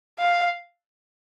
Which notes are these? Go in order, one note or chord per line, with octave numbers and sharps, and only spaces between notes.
F5